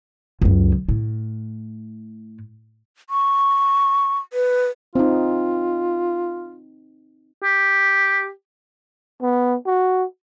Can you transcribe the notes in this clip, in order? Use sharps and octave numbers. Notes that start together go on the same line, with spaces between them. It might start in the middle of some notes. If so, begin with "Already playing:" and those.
C#2 F#2
A2
C#6
B4
C4 D#4 F4
G4
B3
F#4